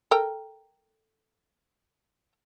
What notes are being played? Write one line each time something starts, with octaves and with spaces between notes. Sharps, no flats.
A4 A#4 G5